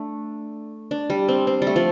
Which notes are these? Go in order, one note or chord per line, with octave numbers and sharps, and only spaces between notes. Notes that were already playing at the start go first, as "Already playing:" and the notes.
Already playing: A3 D4
D4
G3
C4
C4
G3
A3
F3